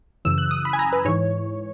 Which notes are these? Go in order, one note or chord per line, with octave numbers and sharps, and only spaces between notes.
F#2 C#3 E3 E6
F#6
D#6
B5
G#5
A#5
B4
G#2 E3 C#5